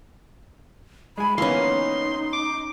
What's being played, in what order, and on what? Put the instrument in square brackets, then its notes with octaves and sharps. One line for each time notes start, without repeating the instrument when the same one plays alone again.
[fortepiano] G#3 G#5 [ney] B5
[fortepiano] E3 A#3 B3 [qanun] C#4 F5 [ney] D#4 [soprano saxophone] C6
[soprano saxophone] D6